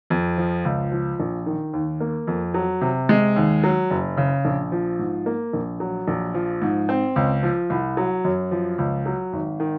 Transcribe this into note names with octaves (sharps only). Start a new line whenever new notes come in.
F2
F3
C#2
F3
A#1
D#3
D#2
A#3
F2
F#3
C3
G#3
D#2
F#3
F#1
C#3
A#1
F3
G#2
A#3
A#1
F#3
A#1
F3
G#2
C4
C#2
F3
C2
F#3
F#2
F3
C#2
F#3
G#1
D#3